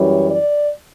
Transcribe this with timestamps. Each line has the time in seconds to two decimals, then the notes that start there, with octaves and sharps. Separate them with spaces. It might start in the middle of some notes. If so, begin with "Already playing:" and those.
Already playing: F#2 E3 G3 C#5
0.30 D5